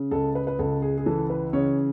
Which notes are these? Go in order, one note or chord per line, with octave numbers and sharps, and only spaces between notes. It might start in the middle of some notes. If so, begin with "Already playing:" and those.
Already playing: C#3
C#2 A4
B4
B4
C#2 A4
G#4
G#4
E3 A4
B4
C#3 C#5